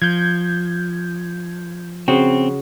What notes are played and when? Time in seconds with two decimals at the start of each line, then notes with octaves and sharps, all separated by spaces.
0.02 F3 G6 G#6
2.08 C#3 C4 F#4